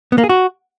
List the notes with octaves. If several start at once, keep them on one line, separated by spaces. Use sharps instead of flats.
B3
A#3
G#4
F#4